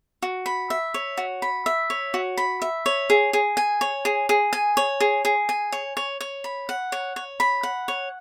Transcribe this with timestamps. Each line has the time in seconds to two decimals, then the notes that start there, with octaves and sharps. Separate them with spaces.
0.22 F#4
0.46 B5
0.70 E5
0.94 C#5
1.17 F#4
1.42 B5
1.66 E5
1.90 C#5
2.14 F#4
2.37 B5
2.62 E5
2.86 C#5
3.10 G#4
3.33 G#4
3.57 G#5
3.81 C#5
4.05 G#4
4.29 G#4
4.53 G#5
4.77 C#5
5.00 G#4
5.25 G#4
5.49 G#5
5.72 C#5
5.97 C#5
6.21 C#5
6.44 B5
6.69 F#5
6.92 C#5
7.16 C#5
7.40 B5
7.63 F#5
7.88 C#5